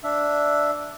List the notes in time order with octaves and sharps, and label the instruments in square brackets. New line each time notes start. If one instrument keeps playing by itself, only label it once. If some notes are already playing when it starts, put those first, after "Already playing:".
[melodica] D4 E5